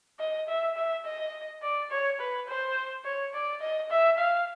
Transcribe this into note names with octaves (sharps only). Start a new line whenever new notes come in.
D#5
E5
E5
D#5
D5
C#5
B4
C5
C#5
D5
D#5
E5
F5